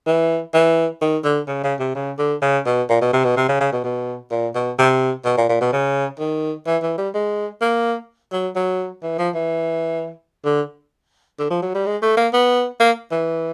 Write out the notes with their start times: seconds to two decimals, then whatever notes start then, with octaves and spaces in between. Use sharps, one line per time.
0.06 E3
0.54 E3
1.01 D#3
1.24 D3
1.47 C#3
1.63 C#3
1.79 C3
1.95 C#3
2.18 D3
2.42 C#3
2.66 B2
2.89 A#2
3.01 B2
3.13 C3
3.24 B2
3.37 C3
3.48 C#3
3.60 C#3
3.72 B2
3.84 B2
4.31 A#2
4.55 B2
4.78 C3
5.25 B2
5.37 A#2
5.49 A#2
5.61 B2
5.72 C#3
6.19 D#3
6.66 E3
6.82 E3
6.98 G3
7.14 G#3
7.61 A#3
8.32 F#3
8.55 F#3
9.03 E3
9.18 F3
9.34 E3
10.45 D3
11.39 D3
11.50 F3
11.62 F#3
11.74 G3
11.86 G#3
12.02 A3
12.17 A#3
12.33 B3
12.80 A#3
13.11 E3